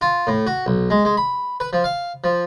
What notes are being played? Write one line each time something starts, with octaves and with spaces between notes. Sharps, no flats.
F4
A2
F#4
B1
G#3
G#3
B5
B4
F3
F5
F3